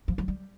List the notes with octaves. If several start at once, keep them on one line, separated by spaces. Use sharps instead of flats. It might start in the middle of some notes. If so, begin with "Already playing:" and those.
F3
F#3
G3